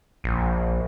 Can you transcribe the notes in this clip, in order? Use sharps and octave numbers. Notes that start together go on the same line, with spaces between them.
A#1